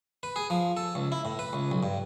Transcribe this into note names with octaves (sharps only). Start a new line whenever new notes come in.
B4
G#4
F3
A4
C#2
E4
A2
B4
C#2
B1
G2